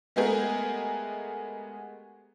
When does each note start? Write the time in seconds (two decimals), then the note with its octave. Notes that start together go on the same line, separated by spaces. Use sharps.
0.16 G#3 A3 B3 G4 G#4 A#4